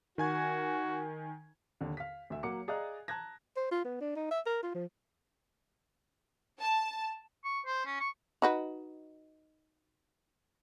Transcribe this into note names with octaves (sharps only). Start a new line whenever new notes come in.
D#3 F#4 G#5 G#6
D#2 D3
F5 B6
D2 E5
F#3 A#3 F#5 D6 C#7
G#4 D5 D#5 F5 A#5 F#6
A5 A#5 F#6 G#6 A#6
C5
F4
B3
D4
D#4
E5
A#4
F4
F3
A5
C#6
C5
C#4
C#6
D#4 F#4 B4